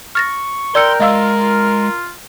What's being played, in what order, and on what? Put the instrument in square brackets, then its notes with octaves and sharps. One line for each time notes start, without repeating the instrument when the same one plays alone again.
[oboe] C#6 [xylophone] F6 A6 A#6
[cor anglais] A#4 [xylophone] D5 E6 C#7 [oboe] G5 [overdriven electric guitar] C6
[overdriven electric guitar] G#3 [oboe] F4 [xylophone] D#5 F5 E6
[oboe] F4